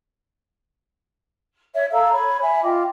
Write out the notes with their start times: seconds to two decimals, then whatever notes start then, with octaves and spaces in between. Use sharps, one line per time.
1.74 C#5 E5
1.92 A4 F5 A#5 E6
2.12 C#5 B5 G#6
2.41 E5 G#5 B5
2.63 F4 D#5 G5 D6